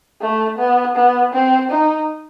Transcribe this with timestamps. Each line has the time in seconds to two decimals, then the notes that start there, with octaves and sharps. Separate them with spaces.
0.21 A3
0.58 B3
0.96 B3
1.33 C4
1.71 D#4